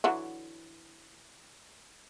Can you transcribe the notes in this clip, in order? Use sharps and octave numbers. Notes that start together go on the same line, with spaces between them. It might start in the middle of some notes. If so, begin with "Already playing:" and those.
D3 E3 F#3